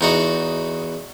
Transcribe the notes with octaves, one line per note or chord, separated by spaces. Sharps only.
E2 D#4 F#4